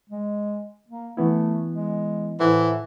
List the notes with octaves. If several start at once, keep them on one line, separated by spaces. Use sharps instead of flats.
G#3
A#3
E3 A3 B3 E4
G#3
A2 E3 A4 C5 F#5